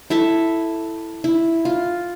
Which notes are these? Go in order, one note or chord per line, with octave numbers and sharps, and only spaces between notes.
E4 A4 E5 A5
E4
F4